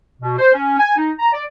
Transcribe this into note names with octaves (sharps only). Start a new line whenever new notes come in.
B2
C5
C#4
G#5
D#4
A#5
D5